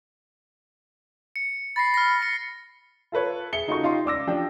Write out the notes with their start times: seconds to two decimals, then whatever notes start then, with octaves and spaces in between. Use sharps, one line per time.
1.36 C#7
1.76 B5 A6 A#6 C7
1.94 F6 A#6
2.22 C#7
3.12 F4 A4 B4 C#5
3.53 G#4 E5 C#7 G7
3.67 C#3 D#4 F4 F#4 A4 C#6
3.83 D#4 F4 G4 C6
4.05 C#2 D5 D6 E6 A#6
4.27 F3 D4 G4 G5